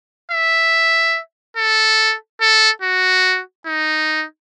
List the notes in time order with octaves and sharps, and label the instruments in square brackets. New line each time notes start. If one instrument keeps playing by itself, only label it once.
[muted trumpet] E5
A4
A4
F#4
D#4